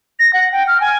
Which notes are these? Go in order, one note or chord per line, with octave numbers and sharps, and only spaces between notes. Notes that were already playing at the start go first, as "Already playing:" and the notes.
A#6
F#5
G5
F6
G#5